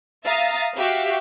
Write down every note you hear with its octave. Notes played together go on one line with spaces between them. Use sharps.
E5 F5 A#5 D#6 A6
F#4 G4 E5 F5